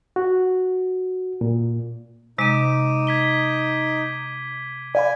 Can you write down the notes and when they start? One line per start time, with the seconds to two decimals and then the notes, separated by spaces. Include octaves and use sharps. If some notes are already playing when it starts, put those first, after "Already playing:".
0.16 F#4
1.41 A#2
2.38 C3 G#3 D#4 D6 D7 D#7
3.07 G#6 B6 G7
4.95 D5 F5 G#5 B5